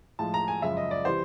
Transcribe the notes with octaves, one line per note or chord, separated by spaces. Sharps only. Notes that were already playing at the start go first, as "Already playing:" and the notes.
A2 F3 G#3 A5
A#5
G#5
F#2 C#3 F3 G#3 E5
D#5
D5
C3 E3 G3 C5